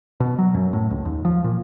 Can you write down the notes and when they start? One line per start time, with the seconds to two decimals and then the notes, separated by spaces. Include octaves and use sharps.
0.20 B2
0.38 F#3
0.54 F#2
0.73 A2
0.91 C#2
1.05 D#2
1.25 F3
1.44 A#2